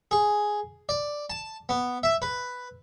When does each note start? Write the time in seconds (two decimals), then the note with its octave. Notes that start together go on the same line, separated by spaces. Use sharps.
0.11 G#4
0.89 D5
1.30 A5
1.69 B3
2.03 E5
2.22 B4